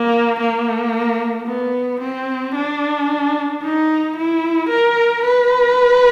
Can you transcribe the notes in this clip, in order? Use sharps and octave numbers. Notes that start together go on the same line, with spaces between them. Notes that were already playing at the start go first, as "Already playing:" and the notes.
Already playing: A#3
A#3
B3
C4
D4
D#4
E4
A#4
B4